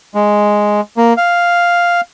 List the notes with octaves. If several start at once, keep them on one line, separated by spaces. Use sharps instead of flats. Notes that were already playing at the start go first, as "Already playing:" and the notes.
G#3
A#3
F5